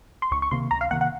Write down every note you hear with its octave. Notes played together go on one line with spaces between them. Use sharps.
C6
C#2 C#6
C#6
C3 D#3 A#3 C6
C#2 A#5
F5
C3 D#3 A#3 F#5
F#5